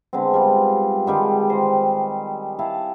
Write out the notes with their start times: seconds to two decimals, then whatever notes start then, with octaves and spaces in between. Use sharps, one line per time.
0.13 D3 G#3 B3 C4
0.34 G3 G#3 F4
1.06 D3 D#3 G3 G#3
1.49 C5 D#5
2.59 E4 F5 A5